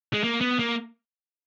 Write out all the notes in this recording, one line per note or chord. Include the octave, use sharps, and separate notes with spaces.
G#3
A#3
B3
A#3